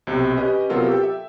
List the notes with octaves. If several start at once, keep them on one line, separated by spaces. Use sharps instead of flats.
B1 C3
C#4 G4 B4 D#5
C3 F#3 B3 F4 A4 A#4
G4 A4 G5
E5